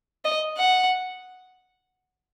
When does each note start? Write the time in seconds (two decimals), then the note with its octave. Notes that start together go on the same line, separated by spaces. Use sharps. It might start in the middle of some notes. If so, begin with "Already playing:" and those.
0.25 D#5
0.57 F#5